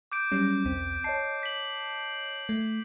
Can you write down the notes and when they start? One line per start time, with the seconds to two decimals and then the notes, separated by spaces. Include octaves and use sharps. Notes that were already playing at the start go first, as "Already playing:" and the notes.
0.12 D6 G6 D7
0.32 F#3 G3 C#4
0.65 B1 E2 C4
1.04 C#5 D#5 A5 C7
1.43 B6 F#7
2.49 A3